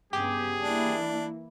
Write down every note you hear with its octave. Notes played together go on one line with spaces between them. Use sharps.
G2 C#3 B3 G4 G#4
E3 A#3 D4 E4